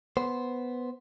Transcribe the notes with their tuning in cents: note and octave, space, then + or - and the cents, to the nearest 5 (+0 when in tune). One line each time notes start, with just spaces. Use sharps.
B3 +0 C5 +0